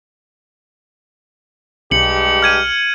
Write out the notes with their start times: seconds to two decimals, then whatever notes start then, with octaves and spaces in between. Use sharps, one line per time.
1.91 B1 G2 G#3 G4 C#7 F#7
2.42 F6 G#6 D#7